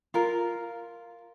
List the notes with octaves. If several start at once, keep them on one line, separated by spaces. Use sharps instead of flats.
F4 A#4